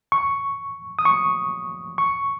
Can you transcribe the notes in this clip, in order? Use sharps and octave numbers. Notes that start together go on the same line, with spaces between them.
C#6
D#6
C#6
C#6